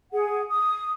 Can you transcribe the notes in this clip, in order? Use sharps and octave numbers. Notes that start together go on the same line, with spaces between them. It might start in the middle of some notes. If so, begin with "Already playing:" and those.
G#4 F#5
D#6